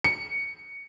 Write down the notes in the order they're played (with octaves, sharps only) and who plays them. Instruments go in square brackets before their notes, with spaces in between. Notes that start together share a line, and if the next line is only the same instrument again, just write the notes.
[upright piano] C#7